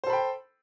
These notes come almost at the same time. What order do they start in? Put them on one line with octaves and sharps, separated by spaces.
C5 A4 B5 G5